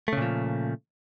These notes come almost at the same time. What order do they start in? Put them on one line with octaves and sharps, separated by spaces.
A3 C#3 A#2 F3